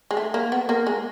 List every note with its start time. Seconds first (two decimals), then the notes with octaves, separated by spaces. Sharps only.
0.11 G#3
0.17 A3
0.34 A#3
0.52 B3
0.69 A#3
0.87 G#3